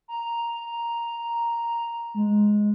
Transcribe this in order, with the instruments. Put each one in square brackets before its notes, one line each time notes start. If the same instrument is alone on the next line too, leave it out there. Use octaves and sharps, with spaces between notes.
[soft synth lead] A#5
G#3